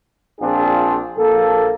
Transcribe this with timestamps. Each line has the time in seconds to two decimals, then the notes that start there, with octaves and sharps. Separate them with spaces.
0.41 A#1 C4 D4 F4 G#4
1.17 A#1 A#3 A4